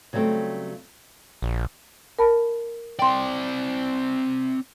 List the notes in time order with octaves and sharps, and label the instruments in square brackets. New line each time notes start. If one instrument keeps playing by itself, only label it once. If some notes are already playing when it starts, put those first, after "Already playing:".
[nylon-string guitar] C#3 F#3 G3 A3 C4
[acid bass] A#1
[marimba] A#4 A5 B5
[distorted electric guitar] C4 D5 [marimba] G5 C6